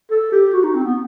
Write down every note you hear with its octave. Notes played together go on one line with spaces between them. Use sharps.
A4
G4
F#4
D#4
C4
B3